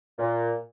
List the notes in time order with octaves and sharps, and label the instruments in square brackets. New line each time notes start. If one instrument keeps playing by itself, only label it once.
[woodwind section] A#2